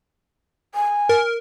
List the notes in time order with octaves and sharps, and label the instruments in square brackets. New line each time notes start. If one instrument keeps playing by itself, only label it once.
[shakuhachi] G#5
[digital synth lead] A#4